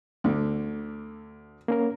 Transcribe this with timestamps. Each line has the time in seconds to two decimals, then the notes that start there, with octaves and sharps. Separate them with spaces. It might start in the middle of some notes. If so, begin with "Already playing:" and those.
0.24 D2 D3
1.68 A#3 C#4 A#4